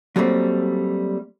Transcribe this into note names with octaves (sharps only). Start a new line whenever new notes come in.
F#3 G3 A3 A#3 C4